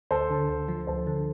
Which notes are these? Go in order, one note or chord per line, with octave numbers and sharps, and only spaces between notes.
D2 A4 C5
D3
D2
F3
D2 A4 C5
D3